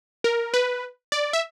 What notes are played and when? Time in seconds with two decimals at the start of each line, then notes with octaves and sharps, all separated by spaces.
0.24 A#4
0.54 B4
1.12 D5
1.33 E5